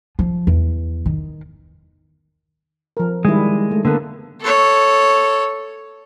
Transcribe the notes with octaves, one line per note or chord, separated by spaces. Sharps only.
F3
E2
D#3
F3 A#4
D#3 G3 G#3 E4
A3
D3 A#3 B3 A4
A4 C#5